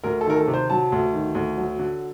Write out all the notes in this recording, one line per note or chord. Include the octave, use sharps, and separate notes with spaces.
D2 A#4
A4
D#3 A#4
A4
C3
C5
F#3 A5
D2
D#3
D2
F#3
D3